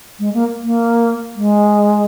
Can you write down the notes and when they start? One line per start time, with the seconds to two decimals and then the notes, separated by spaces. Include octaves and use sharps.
0.19 G#3
0.34 A#3
0.63 A#3
1.36 G#3